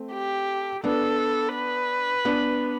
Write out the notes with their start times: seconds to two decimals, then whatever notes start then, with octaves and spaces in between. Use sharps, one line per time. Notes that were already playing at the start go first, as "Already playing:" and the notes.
Already playing: A3 C4
0.12 G4
0.84 B3 D4 A4
1.55 B4
2.25 B3 D4